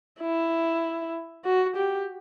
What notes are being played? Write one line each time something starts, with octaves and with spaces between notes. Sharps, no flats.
E4
F#4
G4